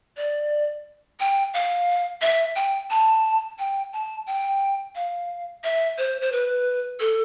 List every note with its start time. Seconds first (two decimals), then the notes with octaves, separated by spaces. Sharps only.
0.17 D5
1.20 G5
1.54 F5
2.22 E5
2.56 G5
2.90 A5
3.59 G5
3.93 A5
4.27 G5
4.95 F5
5.64 E5
5.98 C5
6.21 C5
6.32 B4
7.00 A4